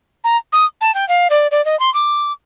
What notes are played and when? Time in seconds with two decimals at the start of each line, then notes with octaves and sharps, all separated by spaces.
0.24 A#5
0.53 D#6
0.81 A5
0.95 G5
1.09 F5
1.30 D5
1.51 D5
1.65 D#5
1.80 C6
1.94 D6